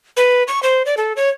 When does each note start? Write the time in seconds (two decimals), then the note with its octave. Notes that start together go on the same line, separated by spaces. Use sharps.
0.17 B4
0.48 C#6
0.63 C5
0.86 D5
0.97 A4
1.16 C#5